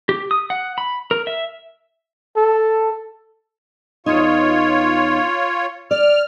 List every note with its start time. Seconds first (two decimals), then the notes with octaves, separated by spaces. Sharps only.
0.09 G4
0.31 D#6
0.50 F#5
0.78 B5
1.11 A#4
1.27 E5
2.37 A4
4.06 E2 D#4 F4 C#5
5.91 D5 F6